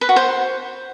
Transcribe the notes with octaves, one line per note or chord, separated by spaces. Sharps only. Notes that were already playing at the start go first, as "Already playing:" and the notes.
B4
F#4
C5